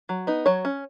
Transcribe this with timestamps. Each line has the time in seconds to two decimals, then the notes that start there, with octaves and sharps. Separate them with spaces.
0.09 F#3
0.27 B3 D#4
0.46 F#3 C#5
0.65 C#4